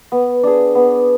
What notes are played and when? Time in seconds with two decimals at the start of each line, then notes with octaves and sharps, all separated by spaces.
0.12 B3
0.43 D4 G#4
0.75 B3